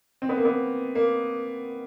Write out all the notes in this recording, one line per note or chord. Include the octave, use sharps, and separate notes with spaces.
C4
B3
A#3
B3
A#3